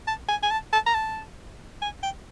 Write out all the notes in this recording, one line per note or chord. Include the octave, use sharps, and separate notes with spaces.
A5
G#5
G#5
A5
A5
A#5
A5
G#5
G5